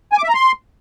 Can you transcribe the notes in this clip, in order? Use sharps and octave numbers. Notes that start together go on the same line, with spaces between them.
G#5
D6
E5
A#5
C6